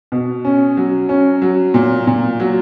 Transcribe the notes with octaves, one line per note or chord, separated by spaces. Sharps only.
B2
C#4
F#3
C#4
F#3
A#2
A#2
F#3